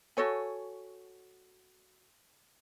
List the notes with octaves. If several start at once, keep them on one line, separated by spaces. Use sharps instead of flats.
F#4 A4 C#5 G#5